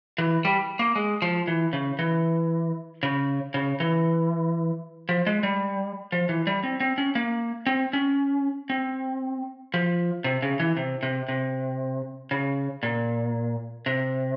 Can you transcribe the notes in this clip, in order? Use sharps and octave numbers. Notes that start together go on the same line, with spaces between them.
E3
G3
A#3
G#3
F3
E3
C#3
E3
C#3
C#3
E3
F3
G#3
G3
F3
E3
G3
C4
C4
C#4
A#3
C4
C#4
C4
F3
C3
C#3
E3
C3
C3
C3
C#3
A#2
C3